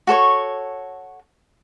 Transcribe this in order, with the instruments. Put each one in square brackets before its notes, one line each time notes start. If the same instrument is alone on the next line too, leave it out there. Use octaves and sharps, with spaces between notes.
[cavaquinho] F#4 A4 C#5 C#6